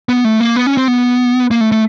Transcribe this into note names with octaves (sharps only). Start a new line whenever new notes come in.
B3
A3
A#3
B3
C#4
C4
B3
A#3
A3
A3